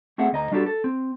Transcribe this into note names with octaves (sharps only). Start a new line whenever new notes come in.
A3 C4 G#4 E5 F#5
D2 D#5 A#5
G3 D4 F#4 G4 A4
A4
C4